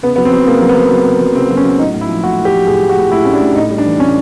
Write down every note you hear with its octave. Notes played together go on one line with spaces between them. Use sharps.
C#3 B3
F#3 B3
C4
F#3
C#3 A#3
F#3
B3
F#3
F#3
C#3
F#3
C#3 C4
F#3
C#4
F#3
A2 D#4
A2
E4
F3
A2 F#4
A2
G4
F3
A2 G#4
A2
F#4
A2
A2 E4
A2 C#4
D4
A2
A2 D#4
G3
D4
E3
A2 C#4